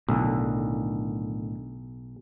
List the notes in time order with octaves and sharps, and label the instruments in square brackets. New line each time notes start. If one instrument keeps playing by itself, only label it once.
[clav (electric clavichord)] B1 [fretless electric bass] A2 D3 D#3